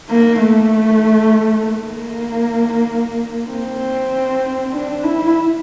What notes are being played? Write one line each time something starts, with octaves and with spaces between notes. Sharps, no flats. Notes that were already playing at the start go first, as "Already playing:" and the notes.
A#3
A3
A#3
C4
D4
E4